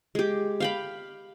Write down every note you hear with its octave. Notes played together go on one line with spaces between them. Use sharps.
G#3 G4
F5 G5 B5